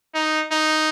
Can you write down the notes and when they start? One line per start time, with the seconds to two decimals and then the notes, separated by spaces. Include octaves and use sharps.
0.15 D#4
0.52 D#4